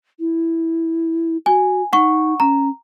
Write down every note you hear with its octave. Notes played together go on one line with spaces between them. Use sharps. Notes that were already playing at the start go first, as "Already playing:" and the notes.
E4
F#4 G#5
D#4 F#5 C#6
C#4 A#5